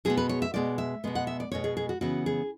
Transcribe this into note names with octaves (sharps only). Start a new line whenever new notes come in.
B2 G#3 B3 G#4
B4
C#5
E5
B2 G#3 B3 D5
E5
B2 G#3 B3
F#5
E5
D5
B2 G#3 B3 C#5
G#4
G#4
F#4
C#3 E3 B3 F#4
G#4